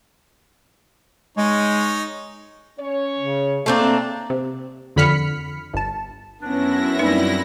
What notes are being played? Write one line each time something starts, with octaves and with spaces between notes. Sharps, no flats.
G#3 D#4 C#5
C#4 C#5
C#3
A3 A#3 C4 D4
C3
F2 D3 B5 F6 B6 C#7
G1 A5
F#2 B3 C#4 D4 E4 A#6
G3 A#3 C4 D#4 B4